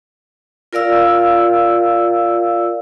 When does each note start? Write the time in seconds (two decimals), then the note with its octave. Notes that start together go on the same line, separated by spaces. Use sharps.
0.73 F4 A#4 D5 F5 E6